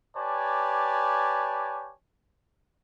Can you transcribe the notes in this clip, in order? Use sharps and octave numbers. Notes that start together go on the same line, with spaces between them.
G4 B4 C#5 D5 G#5 A5